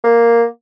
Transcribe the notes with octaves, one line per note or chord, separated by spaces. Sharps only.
A#3